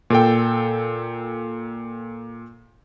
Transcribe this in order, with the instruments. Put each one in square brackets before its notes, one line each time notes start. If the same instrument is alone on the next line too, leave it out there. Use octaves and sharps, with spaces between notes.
[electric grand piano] A#2 A4 G5